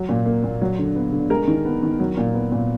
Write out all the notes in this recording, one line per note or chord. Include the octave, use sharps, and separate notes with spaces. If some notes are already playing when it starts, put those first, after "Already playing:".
Already playing: F#3
A#2
A#3
A#2
F#3
D3
B3
D3
G#3 A#4
D#3
B3
D#3
F#3
A#2
B3
A#2